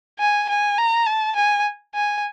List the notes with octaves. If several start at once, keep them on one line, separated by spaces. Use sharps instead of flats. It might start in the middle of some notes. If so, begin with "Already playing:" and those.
G#5
G#5
A#5
A5
G#5
G#5